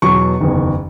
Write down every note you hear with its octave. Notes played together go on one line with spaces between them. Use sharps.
E2 B2 F#3 C#6
F#1 E2 D#3